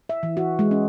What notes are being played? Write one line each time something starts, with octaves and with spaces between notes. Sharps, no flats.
E5
E3
F#4
G#3
C#4